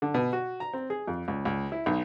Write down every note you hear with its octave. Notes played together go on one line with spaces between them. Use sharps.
D3
B2
F#4
A#5
C4
G#4
F2
C#2
C#2
E4
B1